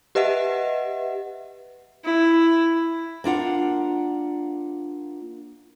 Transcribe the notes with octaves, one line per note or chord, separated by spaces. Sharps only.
G4 B4 D#5 E5 F#5
E4
A#3 D4 F4 F#5